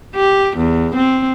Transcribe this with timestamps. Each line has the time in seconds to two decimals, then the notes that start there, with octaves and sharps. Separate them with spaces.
0.15 G4
0.57 E2
0.95 C4